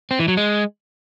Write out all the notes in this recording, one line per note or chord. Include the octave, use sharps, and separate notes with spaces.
C4
E3
F#3
G#3